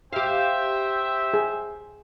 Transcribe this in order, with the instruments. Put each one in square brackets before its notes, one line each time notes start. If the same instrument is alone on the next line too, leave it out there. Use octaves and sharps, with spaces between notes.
[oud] G4 F5 [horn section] C5 E5 [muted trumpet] G5
[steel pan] G#4